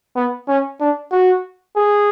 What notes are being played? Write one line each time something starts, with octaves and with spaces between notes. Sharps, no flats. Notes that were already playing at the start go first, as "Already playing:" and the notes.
B3
C#4
D4
F#4
G#4